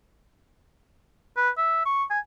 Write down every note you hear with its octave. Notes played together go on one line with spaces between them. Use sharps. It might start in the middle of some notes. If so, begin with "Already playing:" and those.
B4
E5
C#6
G#5